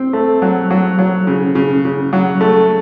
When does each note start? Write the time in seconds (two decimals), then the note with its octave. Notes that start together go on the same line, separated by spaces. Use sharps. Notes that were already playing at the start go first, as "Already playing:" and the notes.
Already playing: C4
0.13 A3
0.42 F#3
0.71 F#3
0.99 F#3
1.27 C#3
1.55 C#3
1.85 C#3
2.13 F#3
2.41 A3